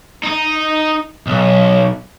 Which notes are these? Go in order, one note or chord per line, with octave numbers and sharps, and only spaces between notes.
D#4
B1